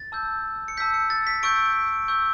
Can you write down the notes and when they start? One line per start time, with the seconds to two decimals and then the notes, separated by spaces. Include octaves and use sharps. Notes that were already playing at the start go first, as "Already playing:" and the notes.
Already playing: A6
0.12 A5 E6 G6
0.68 C#7
0.77 A5 E6 G6 B6
0.94 C#7
1.10 A6
1.27 B6
1.43 C#6 E6 G6 D7
2.08 C#6 E6 G6